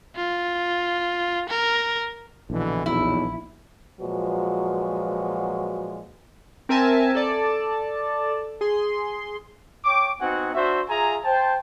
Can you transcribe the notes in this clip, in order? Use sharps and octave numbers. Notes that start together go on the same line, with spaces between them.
F4
A#4
A#1 B2 D3 E3
B1 E2 E4
A#2 F3 F#3 G#3 F#4 B4
C4 A#4 E5 G#5 A5
A4 D5 A5
G#4 C6
C#5 G5 C#6 D6
B3 C4 D#4 F#4 F#5 G#5
D4 F#4 C5 E5
F4 G#4 E5 G#5 A#5
C5 G5 A5